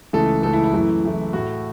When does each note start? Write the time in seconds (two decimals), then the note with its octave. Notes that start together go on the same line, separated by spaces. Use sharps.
0.13 C#2 C#3 E3 A3 A4
0.43 C#2 C#3 E3 A3 A4
0.53 E4
0.64 E4
0.73 F#2 E3 A3
1.04 F#2 E3 A3
1.33 A2 A3 F#4